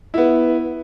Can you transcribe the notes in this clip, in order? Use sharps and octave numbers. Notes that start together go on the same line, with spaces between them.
B3 E4